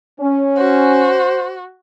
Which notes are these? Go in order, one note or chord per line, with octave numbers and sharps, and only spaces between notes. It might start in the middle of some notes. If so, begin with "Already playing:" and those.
C#4
F#4 C5